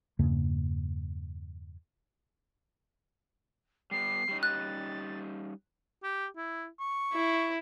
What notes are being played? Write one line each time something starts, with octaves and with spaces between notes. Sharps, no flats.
E2 G2 C#3 A#3
G3 B3 C7
G3 C#4 D#4
F#6 A6
G4
E4
C#6
E4